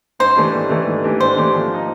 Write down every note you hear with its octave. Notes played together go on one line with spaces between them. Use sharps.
G#2 C5
E3 A3 D4 G4
G#2
E3 A3 D4 G4
G#2
E3 A3 D4 G4
G#2 C5
E3 A3 D4 G4
F3
A#3 D#4